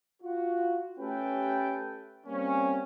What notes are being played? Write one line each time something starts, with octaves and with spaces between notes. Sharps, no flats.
F4 F#4
A3 C#4 G4 A4 B4 G5
G3 A#3 C4 C#4